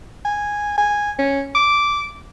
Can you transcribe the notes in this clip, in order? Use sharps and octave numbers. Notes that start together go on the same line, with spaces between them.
G#5
G#5
C#4
D6